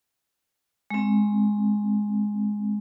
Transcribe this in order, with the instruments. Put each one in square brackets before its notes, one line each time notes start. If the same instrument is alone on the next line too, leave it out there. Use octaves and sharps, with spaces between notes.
[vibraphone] G#3 C4